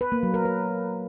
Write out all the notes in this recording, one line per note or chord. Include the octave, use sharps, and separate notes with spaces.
B4
A#3
F#3
A#4
B4